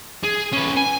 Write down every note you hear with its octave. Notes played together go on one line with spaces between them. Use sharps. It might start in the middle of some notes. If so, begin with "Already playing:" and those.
G#4
C#4 B4
G#5